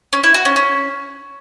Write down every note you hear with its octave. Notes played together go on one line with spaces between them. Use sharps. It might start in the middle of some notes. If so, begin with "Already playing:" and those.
C#4
E4
F#4
C#4
C#4